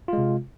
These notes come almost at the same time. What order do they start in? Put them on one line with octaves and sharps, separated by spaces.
F4 G#3 C3